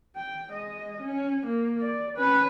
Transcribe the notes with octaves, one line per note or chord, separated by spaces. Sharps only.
G5
G#3 D#5
C#4
A#3
D5
C#4 B4